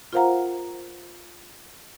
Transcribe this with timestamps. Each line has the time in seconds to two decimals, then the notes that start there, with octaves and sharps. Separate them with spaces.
0.13 F4 A#4 C5 F5 F#5 A#5